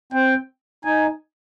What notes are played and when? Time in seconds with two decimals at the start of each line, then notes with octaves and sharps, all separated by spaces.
0.13 C4 G5
0.85 D#4 G#5